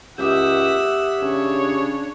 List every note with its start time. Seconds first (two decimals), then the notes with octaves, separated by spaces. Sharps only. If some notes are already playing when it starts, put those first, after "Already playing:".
0.18 C#2 G4 E5 F#5 D6 D#6
1.22 C#3 D4 C#5